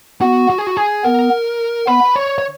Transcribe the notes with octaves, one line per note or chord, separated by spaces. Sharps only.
B3 F#4
F#4
G#4
F#4
G#4
B3 A#4
B3 B4
C#5
C#5